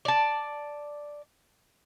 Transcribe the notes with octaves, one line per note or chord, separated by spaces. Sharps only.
D5 A5